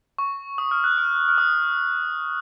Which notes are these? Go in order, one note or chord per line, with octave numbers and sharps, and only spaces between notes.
C#6
D#6
F6
F#6
F6
F6
D#6